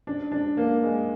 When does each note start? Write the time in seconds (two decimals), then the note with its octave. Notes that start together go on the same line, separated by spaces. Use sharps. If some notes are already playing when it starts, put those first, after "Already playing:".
0.07 D4
0.32 D4
0.57 A#3
0.83 G#3